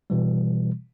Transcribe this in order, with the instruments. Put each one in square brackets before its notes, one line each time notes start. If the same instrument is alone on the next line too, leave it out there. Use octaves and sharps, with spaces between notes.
[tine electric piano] B2 E3 G3